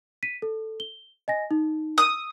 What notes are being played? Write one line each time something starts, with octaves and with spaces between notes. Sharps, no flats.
B6 D#7
A4
G7
D#5 G#5 A#6
D#4
D#6 E6